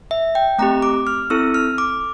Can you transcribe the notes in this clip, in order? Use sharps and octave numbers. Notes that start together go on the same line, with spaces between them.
E5
G5
A3 C4 G4 A#5
D6
F6
C4 E4 A4 E6
F6
D6